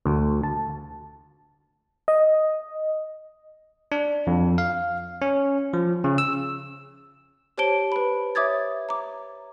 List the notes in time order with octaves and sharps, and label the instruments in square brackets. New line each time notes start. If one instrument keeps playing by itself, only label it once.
[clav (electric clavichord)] D2
A5
[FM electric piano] D#5
[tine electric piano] D4
F2
F5
C#4
F3
C#3
E6
[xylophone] G4 C5 C#5 A5 D7 G7
B4 B5
C#5 E5 D6 D#6 G#6 A6
A#5 D6